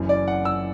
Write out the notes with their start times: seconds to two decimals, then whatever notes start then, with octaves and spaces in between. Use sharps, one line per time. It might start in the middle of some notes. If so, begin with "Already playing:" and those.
Already playing: F#1 F#2 E3
0.09 D5
0.28 F#5
0.45 E6